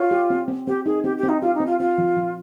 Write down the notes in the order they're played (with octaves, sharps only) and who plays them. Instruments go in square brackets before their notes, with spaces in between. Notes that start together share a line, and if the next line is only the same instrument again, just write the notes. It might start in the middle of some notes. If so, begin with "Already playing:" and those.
Already playing: [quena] F4 [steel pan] C#5
[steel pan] G4
C4
C4
[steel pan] C4 [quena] G4
[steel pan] D#4 [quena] G#4
[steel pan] C4 [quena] G4
[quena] G4
[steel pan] C4
[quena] D#4
[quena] F4 [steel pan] G4
[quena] D#4
[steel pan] C4
[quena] F4
[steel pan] C4 [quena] F4
[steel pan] F3
F3